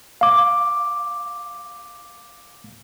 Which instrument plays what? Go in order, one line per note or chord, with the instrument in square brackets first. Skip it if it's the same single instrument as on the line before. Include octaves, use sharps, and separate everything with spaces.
[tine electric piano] F5 D6